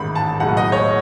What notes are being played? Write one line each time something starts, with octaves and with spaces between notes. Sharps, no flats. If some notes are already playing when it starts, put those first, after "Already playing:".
Already playing: A1 G#2 D#3 G#3 B5
A5
B1 A2 G#3 F#5
D#5
C#5